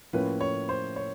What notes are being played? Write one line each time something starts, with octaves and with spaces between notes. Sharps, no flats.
A2 F3 A#3 C#4 B4
C#5
C5
C#5